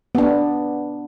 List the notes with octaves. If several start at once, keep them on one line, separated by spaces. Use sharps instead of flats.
B3 D4